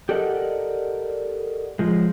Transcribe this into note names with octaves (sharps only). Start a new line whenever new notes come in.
G4 A4 A#4 D5 D#5 F#5
F3 G#3